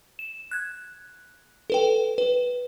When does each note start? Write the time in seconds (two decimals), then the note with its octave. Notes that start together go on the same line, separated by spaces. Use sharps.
0.19 E7
0.51 F#6 G#6
1.70 A4 B4 G5
2.18 B4